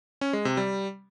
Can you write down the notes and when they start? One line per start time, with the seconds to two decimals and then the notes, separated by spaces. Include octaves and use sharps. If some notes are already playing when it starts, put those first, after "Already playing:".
0.21 C#4
0.33 G#3
0.45 C3
0.57 G3